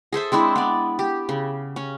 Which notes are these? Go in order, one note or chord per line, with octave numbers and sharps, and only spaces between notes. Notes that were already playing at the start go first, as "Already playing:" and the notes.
G#4 A4 C5 E5
G#3 C4 D4 E4
B3 D5
G4
C#3
C#4